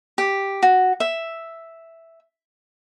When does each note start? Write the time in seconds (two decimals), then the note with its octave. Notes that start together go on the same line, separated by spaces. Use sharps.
0.18 G4
0.63 F#4
1.00 E5